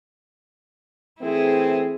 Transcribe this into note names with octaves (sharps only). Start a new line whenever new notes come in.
E3 A3 C4 E4 G#4